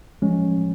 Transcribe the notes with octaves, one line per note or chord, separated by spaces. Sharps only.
F3 G#3 C#4